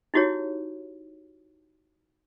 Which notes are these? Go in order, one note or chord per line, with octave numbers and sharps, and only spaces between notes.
D#4 E4 F#4 G4 C#5